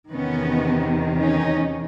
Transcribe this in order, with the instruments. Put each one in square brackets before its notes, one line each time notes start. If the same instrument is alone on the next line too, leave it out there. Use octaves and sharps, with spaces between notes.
[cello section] E2 C3 D#3 B3 C#4
C#4 D#4